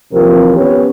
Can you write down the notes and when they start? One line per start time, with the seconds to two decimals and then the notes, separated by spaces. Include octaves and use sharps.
0.13 D#2 C3 E3 F3 C4 A#4
0.56 B3 C#4 G4 B4 C#5